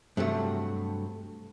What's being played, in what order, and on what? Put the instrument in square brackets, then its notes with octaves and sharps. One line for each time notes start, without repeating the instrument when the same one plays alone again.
[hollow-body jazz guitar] G2 C3 F#3 A3